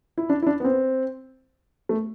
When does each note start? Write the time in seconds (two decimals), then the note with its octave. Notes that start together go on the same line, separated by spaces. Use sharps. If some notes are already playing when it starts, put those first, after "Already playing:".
0.18 E4
0.30 D4
0.42 E4
0.47 D4
0.60 B3
0.65 C4
1.89 A3